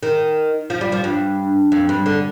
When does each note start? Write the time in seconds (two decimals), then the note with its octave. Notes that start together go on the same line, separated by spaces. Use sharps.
0.03 D#3
0.70 F3
0.81 G3
0.92 F3
1.04 G2
1.72 F2
1.89 G2
2.06 D3